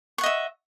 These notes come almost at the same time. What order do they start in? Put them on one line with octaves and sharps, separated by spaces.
C#6 F#5 D#5 E5